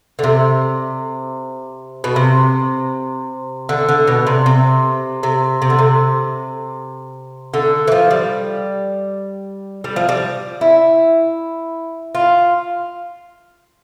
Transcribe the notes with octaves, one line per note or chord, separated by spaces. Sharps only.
D3
C3
B2
C3
D3
D3
B2
C3
C3
C3
C3
D3
C3
D3
E3
F3
G3
G3
F3
G3
E4
F4